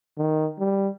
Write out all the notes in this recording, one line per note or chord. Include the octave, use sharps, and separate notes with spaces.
D#3
G3